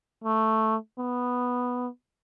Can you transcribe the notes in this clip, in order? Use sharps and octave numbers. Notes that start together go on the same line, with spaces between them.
A3
B3